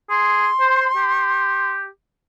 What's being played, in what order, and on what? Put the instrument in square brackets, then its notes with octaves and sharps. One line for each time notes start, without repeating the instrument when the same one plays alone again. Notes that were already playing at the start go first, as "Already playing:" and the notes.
[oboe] G#4 [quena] C6
[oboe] C5
G4